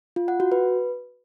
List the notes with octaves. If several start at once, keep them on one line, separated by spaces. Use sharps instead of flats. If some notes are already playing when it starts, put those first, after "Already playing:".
F4
F#5
F#4
B4